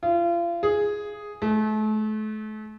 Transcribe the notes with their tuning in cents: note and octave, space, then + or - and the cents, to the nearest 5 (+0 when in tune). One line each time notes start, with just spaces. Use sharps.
F4 -35
G#4 +0
A3 -35